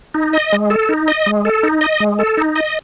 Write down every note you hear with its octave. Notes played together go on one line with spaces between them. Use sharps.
D#4
D#5
G#3
A4
D#4
D#5
G#3
A4
D#4
D#5
G#3
A4
D#4
D#5